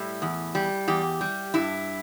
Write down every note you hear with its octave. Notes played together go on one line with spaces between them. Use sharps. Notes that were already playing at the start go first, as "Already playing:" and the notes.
Already playing: A2 G3 E4
E2
G3
E2 G4
G3
G2 E4